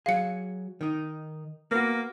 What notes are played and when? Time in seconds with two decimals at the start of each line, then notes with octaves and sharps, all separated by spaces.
0.06 F#3 G#4 F5 C#7
0.81 D#3 D#4
1.71 A#3 B3 F#4